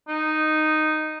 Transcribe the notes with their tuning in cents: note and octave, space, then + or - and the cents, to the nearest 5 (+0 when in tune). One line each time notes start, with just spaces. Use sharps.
D#4 -5